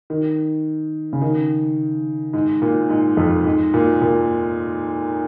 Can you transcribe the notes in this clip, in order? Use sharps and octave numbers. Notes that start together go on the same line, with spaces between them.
D#3
C#3
D#3
G#2
A#2
G#2
F2
G#2
A#2
A#2